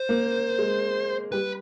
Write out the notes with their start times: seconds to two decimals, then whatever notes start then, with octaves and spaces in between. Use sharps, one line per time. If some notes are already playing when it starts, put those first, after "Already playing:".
Already playing: C5
0.09 A#3
0.59 G#3
1.32 G3 B4